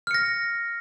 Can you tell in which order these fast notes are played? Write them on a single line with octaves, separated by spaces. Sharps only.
F6 C#7 A#6